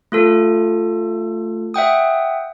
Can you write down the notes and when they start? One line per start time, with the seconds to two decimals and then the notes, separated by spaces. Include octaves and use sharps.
0.12 A3 F4 A4
1.74 E5 F#5 G5 D#6